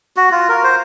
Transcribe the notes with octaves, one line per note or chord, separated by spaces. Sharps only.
F#4
F4
A#4
C5